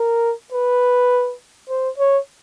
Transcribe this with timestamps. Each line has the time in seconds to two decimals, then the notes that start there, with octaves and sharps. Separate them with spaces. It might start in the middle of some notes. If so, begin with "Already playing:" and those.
Already playing: A#4
0.52 B4
1.69 C5
1.98 C#5